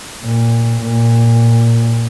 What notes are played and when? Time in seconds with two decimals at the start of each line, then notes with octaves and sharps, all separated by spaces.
0.23 A#2
0.80 A#2